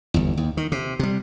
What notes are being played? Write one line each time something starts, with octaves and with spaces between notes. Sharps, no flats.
G1 E2
D#2
D#3
C3
C3 G3